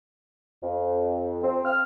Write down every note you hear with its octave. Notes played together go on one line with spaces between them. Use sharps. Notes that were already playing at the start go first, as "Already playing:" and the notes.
F2
C4
F6